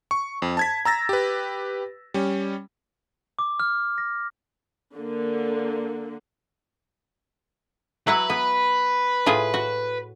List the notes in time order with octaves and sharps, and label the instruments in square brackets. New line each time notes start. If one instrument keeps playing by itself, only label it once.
[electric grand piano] C#6
F2
A5 G#6 B6
A#5 E6 A6 A#6
G4 B4
G3 C#4
[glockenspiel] D6
F6
A#6
[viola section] D3 A#3
[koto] F#3 E4 F#5 [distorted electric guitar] B4
[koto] B3
A2 F4 G#4
F#4